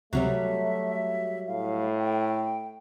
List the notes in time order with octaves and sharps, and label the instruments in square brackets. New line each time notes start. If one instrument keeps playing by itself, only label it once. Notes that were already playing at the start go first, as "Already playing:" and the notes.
[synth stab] C#2 C3 [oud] F#3 G3 C#5 [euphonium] A3 [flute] E5
[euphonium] A2 [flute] F5
[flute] G5